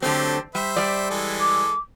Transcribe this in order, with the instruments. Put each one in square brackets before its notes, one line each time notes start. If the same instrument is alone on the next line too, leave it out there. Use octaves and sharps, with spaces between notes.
[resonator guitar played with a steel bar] D3 A3 C4 [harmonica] F#3 G4
[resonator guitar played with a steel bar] G3 [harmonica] C5 E5
[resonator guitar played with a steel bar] G3 D5
[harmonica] E3 G#3 A4
[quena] D6